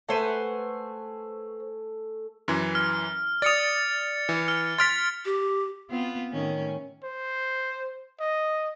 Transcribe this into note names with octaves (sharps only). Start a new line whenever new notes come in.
A3 B4 C5 F#5 G#5
F#2 E3
F6
D5 D#6 A6 C#7 F7
E3
F6
C6 F6 A6 B6 D7
G4
B3 C4 F4
A2 D#3 C#4
C5
D#5